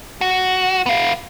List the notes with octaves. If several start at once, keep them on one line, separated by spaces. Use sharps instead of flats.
F#4
B3 F5